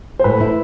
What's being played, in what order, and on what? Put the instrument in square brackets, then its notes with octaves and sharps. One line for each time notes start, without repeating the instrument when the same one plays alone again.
[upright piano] C5
[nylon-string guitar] A2 [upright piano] B4
[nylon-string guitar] E4